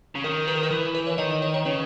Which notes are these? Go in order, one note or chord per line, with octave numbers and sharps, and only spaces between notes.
C#3
D#3 A#4
B4
A#4
B4
E3 A#4
B4
C#5
D#3 D#5
C#5
C#5
C#3 B4